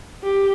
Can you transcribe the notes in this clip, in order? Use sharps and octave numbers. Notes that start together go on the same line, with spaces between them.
G4